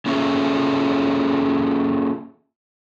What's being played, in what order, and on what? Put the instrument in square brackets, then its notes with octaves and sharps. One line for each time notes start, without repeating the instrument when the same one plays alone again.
[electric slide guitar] A#3 C#4 F4 G#4 A4 E5